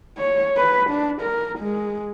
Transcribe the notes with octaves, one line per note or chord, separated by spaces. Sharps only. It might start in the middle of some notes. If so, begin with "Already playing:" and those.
C#5
B4
D4
A#4
G#3